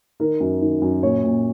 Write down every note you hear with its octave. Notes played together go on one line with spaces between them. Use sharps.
D#3 A#4
F#2
D#3
F#2
A#2 C#5
A#2